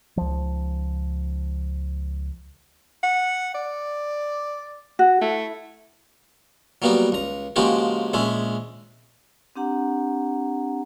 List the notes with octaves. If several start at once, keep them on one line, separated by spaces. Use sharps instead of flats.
C#2 F3
F#5
D5
F#4
A3 E4
F#3 G3 A#3 B3 F#4
C#2 A#5
C#3 F3 G#3 A#3 F#4 G4
A#1 G#3 C#4 E5
C4 D4 G4 F#5 A#5